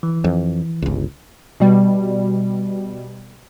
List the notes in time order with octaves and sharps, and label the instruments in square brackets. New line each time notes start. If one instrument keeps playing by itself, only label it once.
[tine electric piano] E3
[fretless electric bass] F2
G1 C#2
[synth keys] B2 G3